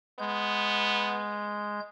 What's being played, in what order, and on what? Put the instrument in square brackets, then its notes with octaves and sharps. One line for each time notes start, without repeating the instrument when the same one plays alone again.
[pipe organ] G#3 G6 [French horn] B3